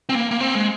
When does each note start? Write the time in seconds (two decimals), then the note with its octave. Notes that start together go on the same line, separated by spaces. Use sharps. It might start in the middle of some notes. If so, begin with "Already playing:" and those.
0.09 C4
0.15 A#3
0.31 A#3
0.40 C4
0.55 G#3